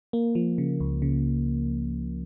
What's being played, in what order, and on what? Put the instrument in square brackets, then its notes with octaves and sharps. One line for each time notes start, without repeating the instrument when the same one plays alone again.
[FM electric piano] A#3
F3
C#3
C#2
C#3